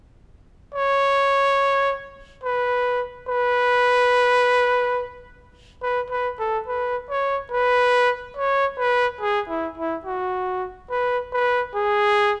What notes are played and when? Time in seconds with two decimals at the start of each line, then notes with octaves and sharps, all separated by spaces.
0.75 C#5
2.44 B4
3.29 B4
5.82 B4
6.11 B4
6.39 A4
6.68 B4
7.10 C#5
7.52 B4
8.37 C#5
8.78 B4
9.21 G#4
9.49 E4
9.78 E4
10.06 F#4
10.90 B4
11.33 B4
11.75 G#4